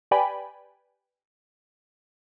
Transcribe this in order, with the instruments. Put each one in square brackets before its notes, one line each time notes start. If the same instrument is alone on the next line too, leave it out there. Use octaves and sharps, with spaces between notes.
[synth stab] G4 B4 D5 G5 G#5 B5